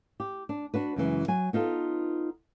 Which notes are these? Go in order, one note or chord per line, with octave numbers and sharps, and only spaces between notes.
G4
D4
D4 F#4 B4
F#2 C#3 E3 G#3
F#3 G#5
B3 D#4 F4 A4